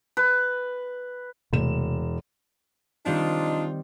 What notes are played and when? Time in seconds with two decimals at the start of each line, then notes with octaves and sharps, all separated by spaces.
0.17 B4
1.53 E1 C3 A3 E7
3.06 D#3 G3 C4 D4 D#4 F4